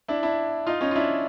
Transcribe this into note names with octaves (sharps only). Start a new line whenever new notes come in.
D4 E4
D4 E4
D#4 F4
C#4 D#4
F4
D4 E4